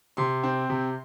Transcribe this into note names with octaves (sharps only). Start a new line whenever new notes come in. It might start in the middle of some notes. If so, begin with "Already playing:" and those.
C3 C6
C4
C3